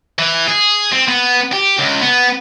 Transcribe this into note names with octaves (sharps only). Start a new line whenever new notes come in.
E3
G#4
C4
B3
G4
C#2
B3